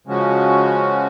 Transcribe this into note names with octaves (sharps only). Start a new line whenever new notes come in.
C#3 F3 G#3 C#4 F#4